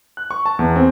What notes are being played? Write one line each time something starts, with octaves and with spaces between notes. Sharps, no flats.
F#6
C#6
A5
E2
C4